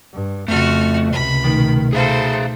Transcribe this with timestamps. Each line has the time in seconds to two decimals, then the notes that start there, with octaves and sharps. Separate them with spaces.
0.13 G2
0.48 F2 C#3 A3 F#4 F6
1.12 C#2 C3 B5
1.44 B2 D#3 A3 D#4
1.93 G#4 A4 C5 E5 F5